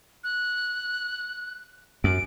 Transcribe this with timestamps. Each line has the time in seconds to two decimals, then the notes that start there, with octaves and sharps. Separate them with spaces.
0.24 F#6
2.04 F#2 D7